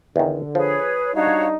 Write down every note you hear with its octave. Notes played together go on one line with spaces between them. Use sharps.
E2 D3 D#3
F3 G#4 B4 C#5
G3 D4 D#4 F#4 C#5 F5